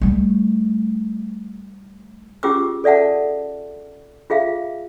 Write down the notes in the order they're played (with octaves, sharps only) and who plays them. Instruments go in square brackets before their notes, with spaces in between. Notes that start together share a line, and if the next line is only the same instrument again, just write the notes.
[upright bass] G3 A3
[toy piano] C#4 F4 G4 G#4 D6 E6
A4 D5 E5 F#5 A5
F4 G#4 E5 F5